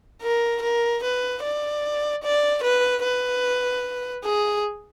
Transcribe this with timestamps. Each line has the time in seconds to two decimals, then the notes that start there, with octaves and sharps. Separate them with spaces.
0.22 A#4
0.62 A#4
1.03 B4
1.43 D5
2.23 D5
2.64 B4
3.04 B4
4.24 G#4